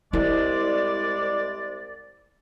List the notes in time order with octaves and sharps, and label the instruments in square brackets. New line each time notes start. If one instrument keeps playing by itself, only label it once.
[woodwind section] C2 G#3 D5 [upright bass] E4